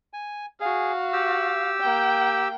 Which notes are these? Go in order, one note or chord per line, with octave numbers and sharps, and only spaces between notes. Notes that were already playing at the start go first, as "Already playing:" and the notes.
G#5
F#4 G#4 F5
G4 E6
A#3 G5